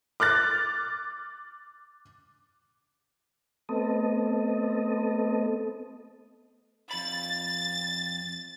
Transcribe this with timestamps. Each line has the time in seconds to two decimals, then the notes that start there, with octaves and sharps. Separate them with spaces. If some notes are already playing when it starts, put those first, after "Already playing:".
0.20 D6 F6 F#6 A6
3.69 A3 B3 C4 A4 D#5
6.91 F2 B5 A6